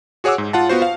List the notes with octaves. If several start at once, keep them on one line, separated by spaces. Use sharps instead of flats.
F#4 G#4 C#5 F#5 D6 E6
G#2
F4 F#5 A5
B3 F4 F#4 C5
F5